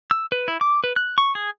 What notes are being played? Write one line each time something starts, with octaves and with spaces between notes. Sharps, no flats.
E6
B4
E4
D6
B4
F#6
C#6
G#4